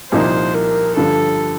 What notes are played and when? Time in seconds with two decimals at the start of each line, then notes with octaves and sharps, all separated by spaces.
0.12 C2 A#2 F3 A#3 D#4 C5
0.55 A#4
0.97 G2 D3 F3 A4